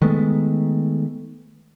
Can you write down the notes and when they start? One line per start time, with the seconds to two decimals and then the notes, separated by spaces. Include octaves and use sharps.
0.02 D#3 G#3 A3 B3